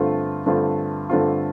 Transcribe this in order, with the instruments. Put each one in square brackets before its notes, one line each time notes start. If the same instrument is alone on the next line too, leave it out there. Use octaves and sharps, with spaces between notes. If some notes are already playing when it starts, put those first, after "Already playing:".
Already playing: [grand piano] G2 D3 A3 C4 F4
G2 D3 A3 C4 F4
G2 D3 A3 C4 F4